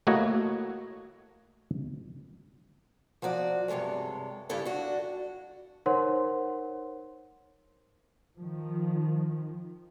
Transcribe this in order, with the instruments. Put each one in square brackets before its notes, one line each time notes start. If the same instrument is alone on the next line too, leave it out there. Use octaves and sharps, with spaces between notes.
[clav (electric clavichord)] A3 A#3 E4 F#4 C#5 D#5
[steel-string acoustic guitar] F3 F#3 F#4 D5
G2 C3 G#3 A4 C#5
G2 C#3 E4 G4 A4 C#5
D4 F#4
[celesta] D#4 A#4 C5 C#5 F#5 C6
[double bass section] D#3 F3